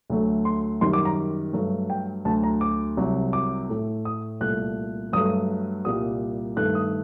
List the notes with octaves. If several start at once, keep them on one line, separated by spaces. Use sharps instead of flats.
D2 D3 F#3 A3
C6
F#2 D#3 G3 C6
D6
A#5
G2 F#3 A3
G5
D2 D3 F#3 A5
A#5
D6
C2 C3 F#3
D6
A2 A3
D#6
C2 A#2 A3 F#6
G2 F#3 A3 D#6
C2 A#2 G3 D#6
G2 D#3 A3 F#6
D#6